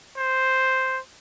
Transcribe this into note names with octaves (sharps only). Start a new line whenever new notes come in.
C5